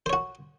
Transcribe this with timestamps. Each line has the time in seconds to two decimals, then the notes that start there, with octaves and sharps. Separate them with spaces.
0.06 C5
0.10 C#5
0.13 F#4